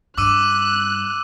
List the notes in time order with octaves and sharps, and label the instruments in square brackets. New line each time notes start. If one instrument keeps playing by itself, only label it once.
[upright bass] G2 [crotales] D6 E6 D#7 [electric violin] F#6